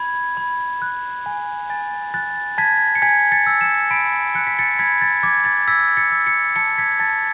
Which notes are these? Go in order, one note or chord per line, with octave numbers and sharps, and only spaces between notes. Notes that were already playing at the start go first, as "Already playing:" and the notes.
Already playing: B5 G#6
B5
F#6
G#5
G#5 A6
F#6 A6
A5 G#6 B6
C#7
G#5 G#6 B6
A6 C#7
E6
C#7 E7
B5 B6 D7
F#6 C#7
B6
A6 C#7
B5 G#6 B6
A6
D6 G#6
A6
E6 G#6 B6
A6 C#7
E6
A6 C#7
A5 A6 C#7
G#6 B6
A5 A6